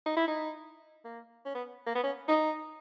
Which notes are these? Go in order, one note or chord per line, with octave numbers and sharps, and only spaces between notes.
D#4
E4
D#4
A#3
C#4
B3
A#3
B3
C#4
D#4